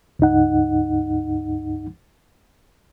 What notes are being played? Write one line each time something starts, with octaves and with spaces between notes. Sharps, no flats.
C#2 G2 D#4 F#5